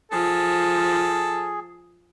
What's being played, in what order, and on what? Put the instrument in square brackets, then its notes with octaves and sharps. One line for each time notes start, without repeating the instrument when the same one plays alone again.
[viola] F3 [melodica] G#4 [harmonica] A4